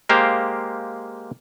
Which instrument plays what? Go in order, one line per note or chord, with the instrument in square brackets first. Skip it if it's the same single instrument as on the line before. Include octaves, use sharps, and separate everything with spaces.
[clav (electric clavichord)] G#3 A#3 G4 C5 F5 G5